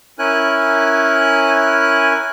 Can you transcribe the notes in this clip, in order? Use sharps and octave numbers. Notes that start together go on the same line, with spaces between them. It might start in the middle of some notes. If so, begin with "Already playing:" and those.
C#4 E4 A#4 G#5 F#6